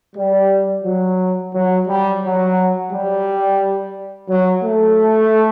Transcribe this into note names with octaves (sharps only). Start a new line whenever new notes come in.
G3
F#3
F#3
G3
F#3
G3
F#3
A3